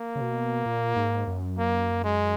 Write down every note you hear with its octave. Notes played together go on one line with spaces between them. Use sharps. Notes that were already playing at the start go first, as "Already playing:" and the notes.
Already playing: A#3
C#3
B2
A#2
G#2
F#2
A#3
G#3